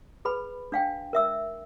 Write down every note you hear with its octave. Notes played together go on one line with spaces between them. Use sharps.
G#4 B4 B5
D4 F5 G5
A#4 E5 E6